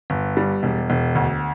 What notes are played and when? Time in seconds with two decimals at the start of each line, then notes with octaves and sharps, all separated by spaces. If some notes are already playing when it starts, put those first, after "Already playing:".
0.10 G1
0.37 G3
0.63 E1
0.90 E1
1.15 D2